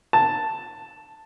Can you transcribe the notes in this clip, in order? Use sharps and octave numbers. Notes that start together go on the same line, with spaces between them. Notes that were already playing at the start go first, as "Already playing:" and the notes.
A5